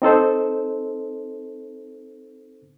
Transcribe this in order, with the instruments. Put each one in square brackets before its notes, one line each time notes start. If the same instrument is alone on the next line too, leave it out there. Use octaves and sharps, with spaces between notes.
[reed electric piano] C4 D#4 A4 C5